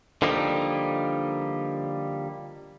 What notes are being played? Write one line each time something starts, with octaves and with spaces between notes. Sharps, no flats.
D3 F3 G3 A#3 D#4